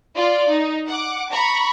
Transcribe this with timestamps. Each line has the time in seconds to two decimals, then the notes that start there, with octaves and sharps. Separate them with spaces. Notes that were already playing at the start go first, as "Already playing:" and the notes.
0.16 F4 D5
0.51 D#4
0.88 F#5 D6
1.32 A#5 B5 C#6